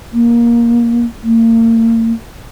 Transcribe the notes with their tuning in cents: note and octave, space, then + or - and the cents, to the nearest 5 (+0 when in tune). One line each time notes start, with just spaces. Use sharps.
A#3 +15
A#3 -40